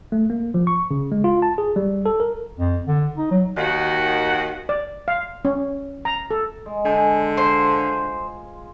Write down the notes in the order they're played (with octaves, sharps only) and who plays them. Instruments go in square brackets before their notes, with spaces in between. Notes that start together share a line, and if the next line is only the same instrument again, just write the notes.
[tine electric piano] A3
A#3
F3
C#6
C#3
G#3
F4
A5
G#4
G3
A4
A#4
[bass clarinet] F2
D3
D#4
F#3
[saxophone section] D#2 D#3 F#4 F#5
[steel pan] D5
F5
C#4
A#5
A4
[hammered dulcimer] G#3
[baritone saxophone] D3 [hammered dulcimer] G#4 G#5
[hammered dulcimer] F4 [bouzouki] C5